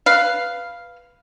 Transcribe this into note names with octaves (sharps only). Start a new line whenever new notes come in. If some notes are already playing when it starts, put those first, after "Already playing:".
B4 F5